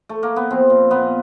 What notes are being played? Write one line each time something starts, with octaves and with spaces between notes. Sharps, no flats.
A3
A#3
B3
F3 C4
A#2
A#2 B3